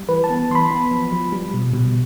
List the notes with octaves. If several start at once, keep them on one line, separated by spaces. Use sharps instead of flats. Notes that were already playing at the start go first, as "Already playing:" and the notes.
Already playing: G3
E3 B4
A5
B3
E3 B5 C6
B3
F3
F3
G3
B2
B2